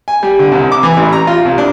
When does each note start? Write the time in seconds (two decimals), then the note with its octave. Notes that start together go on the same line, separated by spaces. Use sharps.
0.08 G#5
0.23 G3
0.39 D3
0.51 C2
0.72 D6
0.83 E3
0.97 A1
1.13 A#5
1.27 F4
1.45 C2
1.58 D4